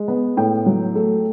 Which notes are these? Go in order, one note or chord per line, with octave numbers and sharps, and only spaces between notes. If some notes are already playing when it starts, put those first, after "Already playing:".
Already playing: G#3
B3
A2 G5
F#3
A3